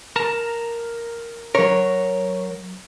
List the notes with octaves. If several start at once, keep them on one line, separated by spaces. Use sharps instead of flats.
A#4 A5 A#5
F#3 A#4 C#5